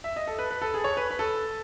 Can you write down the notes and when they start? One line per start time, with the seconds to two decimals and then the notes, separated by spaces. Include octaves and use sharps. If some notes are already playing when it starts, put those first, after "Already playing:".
0.04 E5
0.16 D#5
0.27 A4
0.39 B4
0.51 B4
0.62 A4
0.74 G#4
0.84 C#5
0.97 B4
1.11 B4
1.19 A4